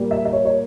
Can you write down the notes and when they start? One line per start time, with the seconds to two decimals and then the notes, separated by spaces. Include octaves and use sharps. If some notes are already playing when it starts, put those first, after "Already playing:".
Already playing: A#2 G3 A#3
0.11 E5
0.25 E5
0.33 C#5
0.45 C#5